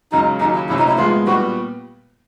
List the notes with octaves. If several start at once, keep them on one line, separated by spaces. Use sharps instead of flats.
C#2 C#3 F#3 D#4
D#2 C#3 F#3 D#4
E4
C2 C3 F3 A3 C#4 E4
D#4
E4
A#2 F3 G#3 B3 F4
A#2 G3 B3 F#4